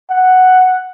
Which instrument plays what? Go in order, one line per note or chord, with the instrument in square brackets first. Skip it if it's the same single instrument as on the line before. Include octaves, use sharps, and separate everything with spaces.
[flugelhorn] F#5